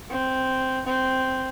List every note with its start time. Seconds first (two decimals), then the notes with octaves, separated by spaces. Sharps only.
0.10 C4
0.87 C4